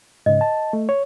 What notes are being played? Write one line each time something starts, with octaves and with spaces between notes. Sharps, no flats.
G#2 C#3 D#5
A5
A3
C#5